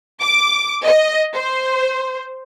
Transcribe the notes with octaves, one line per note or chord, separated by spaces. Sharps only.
D6
D#5
C5